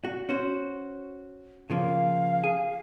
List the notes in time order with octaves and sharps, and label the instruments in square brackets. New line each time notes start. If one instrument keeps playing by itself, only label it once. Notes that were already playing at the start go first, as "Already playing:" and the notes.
[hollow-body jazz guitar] F#4
C#4 F#4 C5
[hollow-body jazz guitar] C#3 F3 A#3 [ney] F5
[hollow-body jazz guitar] G#4